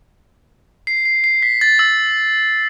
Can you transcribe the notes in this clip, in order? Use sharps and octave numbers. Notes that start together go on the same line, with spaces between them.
C7
C7
C7
B6
A6
E6